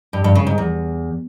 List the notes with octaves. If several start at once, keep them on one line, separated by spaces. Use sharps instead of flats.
G2
G2
C#3
G#2
E2